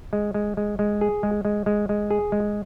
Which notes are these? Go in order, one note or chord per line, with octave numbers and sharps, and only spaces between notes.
G#3
G#3
G#3
G#3
G#4
G#3
G#3
G#3
G#3
G#4
G#3